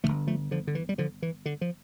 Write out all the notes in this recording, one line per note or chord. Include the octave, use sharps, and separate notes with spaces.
G1 F2 D3 F3 A3
F3 A3
D3 F3
D3
E3
G3
D3 F3
E3
D3
F3